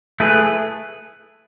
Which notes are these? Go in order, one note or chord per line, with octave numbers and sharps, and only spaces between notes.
A3 E4 G#4 B4